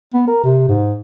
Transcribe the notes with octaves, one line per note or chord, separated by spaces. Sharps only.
B3
A#4
C3
G#2